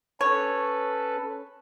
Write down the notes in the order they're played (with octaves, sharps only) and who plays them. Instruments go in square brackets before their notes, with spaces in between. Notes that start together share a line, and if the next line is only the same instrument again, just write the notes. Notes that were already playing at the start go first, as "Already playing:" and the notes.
[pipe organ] C#4 A4 B4 [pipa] C#5